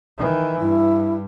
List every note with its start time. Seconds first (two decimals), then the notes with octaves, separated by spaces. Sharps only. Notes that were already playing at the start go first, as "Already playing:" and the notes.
0.18 D#3 E3
0.60 G2 E4